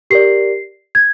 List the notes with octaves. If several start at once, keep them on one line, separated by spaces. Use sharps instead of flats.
G4 A#4 D5 C7
G#6